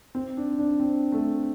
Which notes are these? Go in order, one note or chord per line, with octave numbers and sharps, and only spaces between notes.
C4
D4
D4
C4
A3